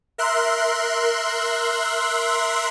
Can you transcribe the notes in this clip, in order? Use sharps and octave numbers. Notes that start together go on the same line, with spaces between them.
A#4 E5 C6 F#6